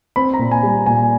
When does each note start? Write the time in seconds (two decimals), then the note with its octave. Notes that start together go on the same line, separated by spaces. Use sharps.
0.16 C4 B5
0.34 A#5
0.39 A#2
0.51 G#5
0.63 G3
0.86 A#2 G#5